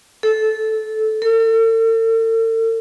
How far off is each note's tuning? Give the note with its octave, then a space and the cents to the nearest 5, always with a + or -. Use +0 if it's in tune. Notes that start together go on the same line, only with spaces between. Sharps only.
A4 -15
A4 +45